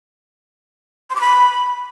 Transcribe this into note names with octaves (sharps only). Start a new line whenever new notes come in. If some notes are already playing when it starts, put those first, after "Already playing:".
C6
D6
B5